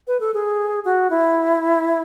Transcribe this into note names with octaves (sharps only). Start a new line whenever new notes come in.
B4
A4
G#4
F#4
E4